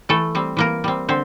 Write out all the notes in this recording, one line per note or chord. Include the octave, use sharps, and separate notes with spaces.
E3 A3 A4
G3 C4
E3 A#3 A#4
G3 C4
D3 C4 C5